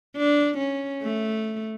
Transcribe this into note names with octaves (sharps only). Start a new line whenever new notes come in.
D4
C#4
A3